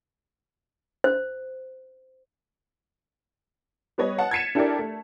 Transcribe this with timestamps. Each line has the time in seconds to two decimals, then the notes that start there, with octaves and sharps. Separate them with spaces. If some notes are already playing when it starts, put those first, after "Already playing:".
1.04 C5
3.98 G3 B3 B4 C#5 D#5
4.18 F#5 A5
4.31 G#6 A6 B6 C#7 D#7 E7
4.55 D4 E4 G4 A4 A#4 D5
4.79 A3